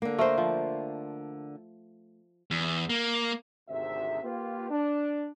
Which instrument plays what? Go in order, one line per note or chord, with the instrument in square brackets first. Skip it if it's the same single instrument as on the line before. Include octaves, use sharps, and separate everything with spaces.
[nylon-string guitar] D3 A#3
[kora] A3 A#4 C5
F3
[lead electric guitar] E2
A#3
[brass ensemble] G#1 D2 C3 E5
A#3 F4 G4 B4
D4